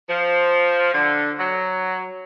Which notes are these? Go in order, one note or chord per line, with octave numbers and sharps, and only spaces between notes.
F3
D3
F#3